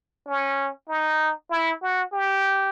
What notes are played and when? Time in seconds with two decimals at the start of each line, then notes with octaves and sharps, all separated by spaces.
0.26 C#4
0.89 D#4
1.51 E4
1.82 F#4
2.13 G4